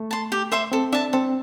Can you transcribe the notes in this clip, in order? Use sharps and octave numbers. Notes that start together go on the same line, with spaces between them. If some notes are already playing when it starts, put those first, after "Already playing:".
Already playing: A3
A5 C6
G4
C5 E5 C6
C4 A4
D4 E5 A5
C4 A4